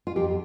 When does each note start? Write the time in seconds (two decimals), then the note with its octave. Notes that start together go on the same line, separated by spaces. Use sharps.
0.07 F4
0.16 F2 G4